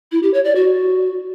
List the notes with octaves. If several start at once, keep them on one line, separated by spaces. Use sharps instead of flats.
E4
G4
C#5
D5
F#4